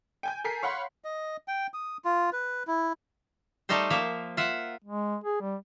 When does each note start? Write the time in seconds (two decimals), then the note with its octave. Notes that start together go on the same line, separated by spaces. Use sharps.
0.23 G5 G#5 G6
0.44 A4 A#4 G#5 B6 C7
0.63 C#5 F5 F#5 B5 C6
1.04 D#5
1.48 G5
1.74 D#6
2.05 F4
2.33 B4
2.67 E4
3.69 G3 A3 D#4 A4 C5
3.90 F3 A#3 E5
4.37 F4 E5 F#5
4.84 G#3
5.24 G#4
5.41 G3